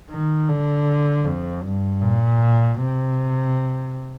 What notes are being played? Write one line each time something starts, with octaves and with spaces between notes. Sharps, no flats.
D#3
D3
F2
G2
A#2
C3